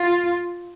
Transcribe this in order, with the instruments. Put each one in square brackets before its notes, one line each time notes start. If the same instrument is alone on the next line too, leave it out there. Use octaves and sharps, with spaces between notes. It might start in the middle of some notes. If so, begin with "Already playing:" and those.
Already playing: [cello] F4